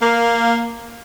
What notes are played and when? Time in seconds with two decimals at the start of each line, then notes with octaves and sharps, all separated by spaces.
0.01 A#3